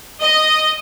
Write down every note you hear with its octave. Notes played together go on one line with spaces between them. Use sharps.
D#5